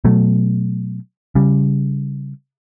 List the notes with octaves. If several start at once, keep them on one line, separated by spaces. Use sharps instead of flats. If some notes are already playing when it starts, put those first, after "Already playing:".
B2 F#3 A3
C#3 G3